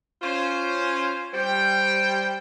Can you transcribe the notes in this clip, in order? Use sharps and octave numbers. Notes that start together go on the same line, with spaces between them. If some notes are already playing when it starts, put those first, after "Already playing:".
C#4 F4 C5
G3 C5 G5